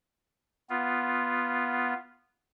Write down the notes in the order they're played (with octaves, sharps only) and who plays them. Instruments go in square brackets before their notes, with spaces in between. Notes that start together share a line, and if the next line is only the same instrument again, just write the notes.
[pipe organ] B3 F4